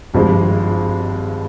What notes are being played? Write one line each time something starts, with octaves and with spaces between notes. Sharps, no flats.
G#1 G2 F3 G#3